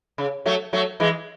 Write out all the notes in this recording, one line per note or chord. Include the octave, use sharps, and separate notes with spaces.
C#3
F#3 A3
F#3 A3
E3 G#3